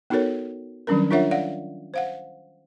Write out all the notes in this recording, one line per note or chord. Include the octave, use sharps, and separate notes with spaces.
B3 D#4 F#4 A4 A#4 C#5
D#3 F#3 G3 C#4 D4 A#4
D4 F4 A#4 C#5 E5 F#5
D5 F5 F#5
C5 F5 F#5